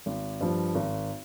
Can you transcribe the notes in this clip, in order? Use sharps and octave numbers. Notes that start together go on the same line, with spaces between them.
G#1
G2 F3
G#1